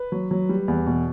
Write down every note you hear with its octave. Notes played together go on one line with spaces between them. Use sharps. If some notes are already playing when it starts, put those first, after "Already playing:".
Already playing: B4
F#3
F#3
G3
E2
B2